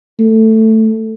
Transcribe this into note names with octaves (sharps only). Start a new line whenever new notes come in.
A3